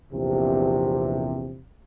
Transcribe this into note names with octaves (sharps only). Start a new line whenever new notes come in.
A#1 E2 C3